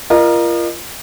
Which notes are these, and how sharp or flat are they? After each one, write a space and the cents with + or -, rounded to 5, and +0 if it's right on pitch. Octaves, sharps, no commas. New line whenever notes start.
F4 -30 A#4 +20 D#5 -40